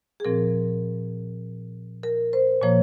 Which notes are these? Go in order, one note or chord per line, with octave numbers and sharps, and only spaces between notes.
G#4
A#2 F3 C4 A#4
A#4
C5
A#2 F3 A#3 C#5